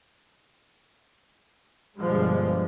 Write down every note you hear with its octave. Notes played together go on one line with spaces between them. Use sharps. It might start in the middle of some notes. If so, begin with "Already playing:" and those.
G1 B2 D3 F3 G3 G#3